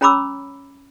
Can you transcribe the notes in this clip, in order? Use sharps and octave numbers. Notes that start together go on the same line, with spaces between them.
C#4 C#5 A#5 B5 D6 E6